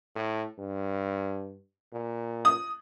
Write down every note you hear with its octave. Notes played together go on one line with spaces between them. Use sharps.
A2
G2
A#2
D#6